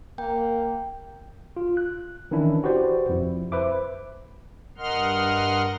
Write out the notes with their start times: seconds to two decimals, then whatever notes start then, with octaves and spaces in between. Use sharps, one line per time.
0.18 A#3 G5
1.57 F4
1.77 F#6
2.31 D#3 E3 C#4 D4 E4
2.64 F#4 G4 B4 C5 D5
3.09 F2 E4
3.52 B4 C5 E5 D6
4.78 G2 A#4 D#5 F#5 C6 F6